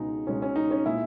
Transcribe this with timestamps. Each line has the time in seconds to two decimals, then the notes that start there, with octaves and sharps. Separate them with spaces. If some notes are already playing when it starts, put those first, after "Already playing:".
Already playing: C#2 B2 G#3 D#4
0.27 C#2 B2 G#3 C#4
0.42 C#4
0.56 D#4
0.71 C#4
0.86 A#2 G#3 E4